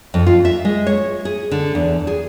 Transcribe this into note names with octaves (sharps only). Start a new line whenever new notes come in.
F2
F4
E5
G#3
C#5
G#4
D3
E2
G#4